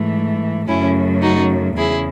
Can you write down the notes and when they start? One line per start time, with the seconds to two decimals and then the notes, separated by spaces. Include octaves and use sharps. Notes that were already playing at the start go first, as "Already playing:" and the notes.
Already playing: G#2 E3 A3
0.67 F#2 C#3 F#3 A3 C#4 E4
1.22 D#4 F#4
1.77 E2 C#3 E4 G#4